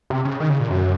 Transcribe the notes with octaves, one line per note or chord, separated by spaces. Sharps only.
C3
C#3
D#3
C#3
A#2
F#2